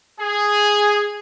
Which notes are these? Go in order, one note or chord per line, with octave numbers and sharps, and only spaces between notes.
G#4